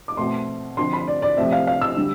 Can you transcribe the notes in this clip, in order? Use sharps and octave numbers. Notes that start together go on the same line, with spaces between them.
D6
B2 A3 C4 C6
D3 F3 C4 C6
B5
D5
D5
C3 F3 A3 C4 E5
F5
F5
E6
D3 G3